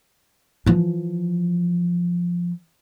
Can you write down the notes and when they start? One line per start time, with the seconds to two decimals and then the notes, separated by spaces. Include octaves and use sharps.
0.66 E3 F3